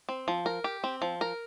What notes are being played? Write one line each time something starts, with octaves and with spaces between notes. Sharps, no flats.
C4
F3
A#4
G4
C4
F3
A#4